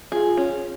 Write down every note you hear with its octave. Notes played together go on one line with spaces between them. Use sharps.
F4 G#4
C#4